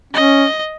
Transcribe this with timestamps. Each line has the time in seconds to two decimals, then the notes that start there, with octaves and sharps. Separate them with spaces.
0.13 C#4 D#5